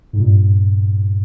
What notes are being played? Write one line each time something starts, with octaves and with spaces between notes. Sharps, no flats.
G#2
G2 A#2